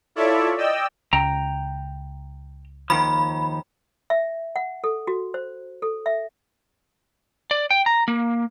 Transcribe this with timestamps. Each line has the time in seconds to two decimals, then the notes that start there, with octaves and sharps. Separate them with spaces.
0.15 E4 F4 A4 C#5 D5 E5
0.57 D5 D#5 G5 E6
1.13 C#2 G5 A#5
2.90 D#2 D#3 F3 B5
4.10 E5
4.56 F#5
4.84 A4
5.07 F#4
5.34 C5
5.82 A4
6.06 E5
7.51 D5
7.70 G5
7.86 A#5
8.08 A#3